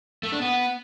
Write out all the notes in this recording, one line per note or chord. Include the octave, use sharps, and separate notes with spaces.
A3
D4
B3